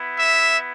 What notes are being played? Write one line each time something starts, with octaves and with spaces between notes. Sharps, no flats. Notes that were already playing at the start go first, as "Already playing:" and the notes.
Already playing: B3 E4
E5